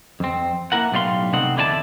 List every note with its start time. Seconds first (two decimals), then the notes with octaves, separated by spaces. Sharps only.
0.20 F2 C4
0.72 A#3 E4 A#4 F#5
0.92 B1 A2 G3 D5 F5 C6
1.33 C3 A3 C4 D#4 F#5
1.56 E2 D3 E4 B4 D5 A5